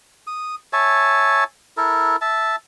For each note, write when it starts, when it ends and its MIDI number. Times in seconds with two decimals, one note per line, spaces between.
0.27 0.55 87
0.73 1.44 73
0.73 1.44 76
0.73 1.44 80
0.73 1.44 81
1.77 2.16 64
1.77 2.16 69
1.77 2.16 70
2.21 2.56 76
2.21 2.56 81